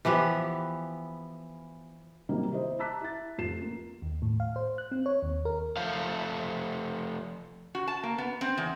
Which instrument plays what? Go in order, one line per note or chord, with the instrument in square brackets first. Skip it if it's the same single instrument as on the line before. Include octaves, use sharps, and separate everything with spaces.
[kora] E3 F3 B3 G4
[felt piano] C3 D#3 F#3 G3 A#3
E4 G4 C5 D#5
A5 A#5 D6 E6 F#6 B6
E4 A6
F1 F3 F4 C7 E7
A#3
[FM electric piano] D#2
A2
F5
C5
F#6
C4
C#5
D#2
A#4
[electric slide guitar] F3 A3 F5
[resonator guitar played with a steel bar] F#4
A5
A#3
B3
C4
E2